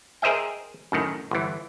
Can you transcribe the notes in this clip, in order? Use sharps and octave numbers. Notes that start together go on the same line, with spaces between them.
G#4 A#4 C5 D#5 E5 G5
F#2 A2 D#3
G1 E3